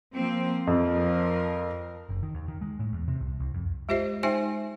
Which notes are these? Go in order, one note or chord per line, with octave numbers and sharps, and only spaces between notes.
F3 A#3 C4
F2 F3 A#4
F#1
D#3
D#2
D#3
G#3
A2
E2
C3
C2
C2
F2
G#3 F4 G4 C5 D#5 E5
G#3 D#4 C5 E5 G5 G#5